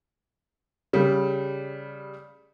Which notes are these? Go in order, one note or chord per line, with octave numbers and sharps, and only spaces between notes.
C#3 G3